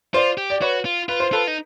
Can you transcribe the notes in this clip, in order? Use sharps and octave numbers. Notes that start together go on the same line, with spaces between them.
F4 C5 D5
G4
D5
F#4 B4 C#5
F4
F4 B4
C5
F4 A4 B4
D#4